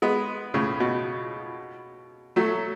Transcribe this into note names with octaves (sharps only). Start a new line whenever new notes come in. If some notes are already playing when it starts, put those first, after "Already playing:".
G#3 B3
A2 C#3
B2
F#3 A3